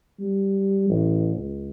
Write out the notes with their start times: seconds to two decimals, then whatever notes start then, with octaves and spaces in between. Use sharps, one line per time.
0.20 G3
0.90 A1
1.37 C#2